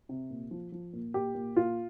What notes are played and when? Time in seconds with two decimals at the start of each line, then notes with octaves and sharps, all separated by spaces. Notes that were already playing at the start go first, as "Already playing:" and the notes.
0.09 C3
0.30 A#2
0.51 F3
0.72 F3
0.93 A#2
1.14 A#2 G4
1.35 A#2
1.56 A#2 F4